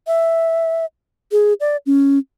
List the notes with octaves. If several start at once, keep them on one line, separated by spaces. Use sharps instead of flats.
E5
G#4
D5
C#4